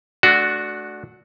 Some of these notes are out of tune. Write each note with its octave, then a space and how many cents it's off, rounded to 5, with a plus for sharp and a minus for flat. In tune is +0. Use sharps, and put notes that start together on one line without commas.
A3 -25 D4 +0 F#4 +0